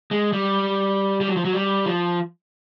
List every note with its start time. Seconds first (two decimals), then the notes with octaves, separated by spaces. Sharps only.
0.11 G#3
0.33 G3
1.21 G3
1.28 F#3
1.36 F3
1.45 F#3
1.53 G3
1.86 F3